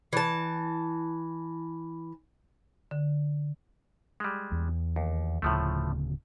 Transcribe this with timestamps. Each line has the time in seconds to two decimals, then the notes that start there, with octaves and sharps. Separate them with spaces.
0.13 E3 A5
2.91 D3
4.20 G3 G#3
4.52 E2
4.96 D#2
5.42 D1 D2 A2 C#3 F3 A3